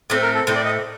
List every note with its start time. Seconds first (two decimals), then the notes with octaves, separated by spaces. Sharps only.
0.10 A2 A3 C4
0.22 A#4
0.34 A4
0.47 A2 A3 C4 C5
0.55 D5
0.65 D#5